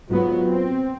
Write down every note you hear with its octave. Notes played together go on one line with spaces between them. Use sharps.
G#2 F#3 B3 F4
C4